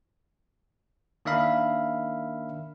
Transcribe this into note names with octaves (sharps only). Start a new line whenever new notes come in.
D#3 A#3 D4 E5 F5 B5